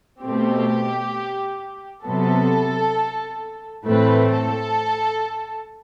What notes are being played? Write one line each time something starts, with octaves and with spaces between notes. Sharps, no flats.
B2 A3 C4 G4
C3 F#3 B3 A4
A2 E3 A3 C4 B4
A4